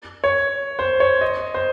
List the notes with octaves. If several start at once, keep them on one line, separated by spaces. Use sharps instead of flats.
C#5
C5
C#5
D#5
C5